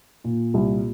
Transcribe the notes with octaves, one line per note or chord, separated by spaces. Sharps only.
A#2
C2